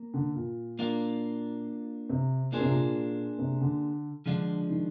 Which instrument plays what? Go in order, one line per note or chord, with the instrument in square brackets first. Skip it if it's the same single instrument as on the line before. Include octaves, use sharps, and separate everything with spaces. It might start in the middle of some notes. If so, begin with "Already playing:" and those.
Already playing: [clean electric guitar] A#3
[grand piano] D3
A#2
[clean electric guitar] A#3 D4 F4
[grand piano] C3
[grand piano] A#2 [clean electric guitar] A#3 D4 G#4 C5
[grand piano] C3
A#2
C3
D3
[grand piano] D3 [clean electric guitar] F3 G#3 D4 F4
[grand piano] D#3